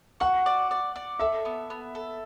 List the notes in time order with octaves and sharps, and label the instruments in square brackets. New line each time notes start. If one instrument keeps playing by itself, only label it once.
[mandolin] F#4 [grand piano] F#5
[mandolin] D5
D5
D5
[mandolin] A4 [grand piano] E5
[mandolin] B3
B3
A4